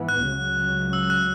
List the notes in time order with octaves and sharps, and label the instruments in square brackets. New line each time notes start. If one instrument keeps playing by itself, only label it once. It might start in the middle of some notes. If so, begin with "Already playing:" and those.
Already playing: [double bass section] G#2 E3 B3
[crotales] F#6
[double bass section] C#2 C#3 F#3
[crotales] E6
F#6